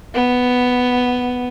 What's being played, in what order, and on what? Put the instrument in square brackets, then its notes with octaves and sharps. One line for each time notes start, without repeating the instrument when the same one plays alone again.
[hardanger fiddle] B3